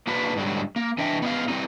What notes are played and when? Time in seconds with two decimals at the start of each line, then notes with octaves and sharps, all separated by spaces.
0.07 A#3 D4 D#4 F#4 B4
0.36 G#2 D3 F#3 G3
0.76 A#3
0.98 E3 D4 D#5 E5 G5
1.22 B3 D#4 F5
1.48 E3 G3 C4 D#4